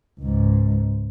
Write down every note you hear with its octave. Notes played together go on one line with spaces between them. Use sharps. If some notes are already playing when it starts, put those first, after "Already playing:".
C#2 G#2